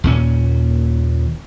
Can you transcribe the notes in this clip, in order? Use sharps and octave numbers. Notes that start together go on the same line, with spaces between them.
D#2 A#2 C#4